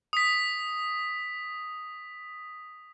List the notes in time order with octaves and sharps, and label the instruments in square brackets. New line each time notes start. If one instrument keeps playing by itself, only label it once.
[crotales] D#6 B6